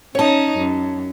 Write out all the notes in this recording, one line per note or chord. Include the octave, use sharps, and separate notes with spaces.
C#4 D#4 C#5 A5
F#2